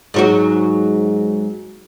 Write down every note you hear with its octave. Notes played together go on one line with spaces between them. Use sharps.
G#2 F#3 F#4